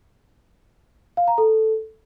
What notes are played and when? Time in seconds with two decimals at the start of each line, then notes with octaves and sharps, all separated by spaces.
1.17 F5
1.28 A#5
1.38 A4